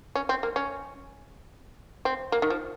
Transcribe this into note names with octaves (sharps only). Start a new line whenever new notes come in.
C#4
C4
A#3
C#4
C4
A#3
D#3
F3